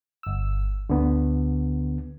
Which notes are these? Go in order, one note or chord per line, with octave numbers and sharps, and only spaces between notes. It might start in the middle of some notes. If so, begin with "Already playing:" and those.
G1 E6
D2 D3 B3